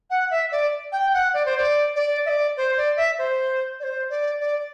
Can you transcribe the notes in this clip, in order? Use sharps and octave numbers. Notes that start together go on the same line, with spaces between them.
F#5
E5
D5
G5
F#5
D5
C5
D5
D5
E5
D5
C5
D5
E5
C5
D5
C5
D5
D5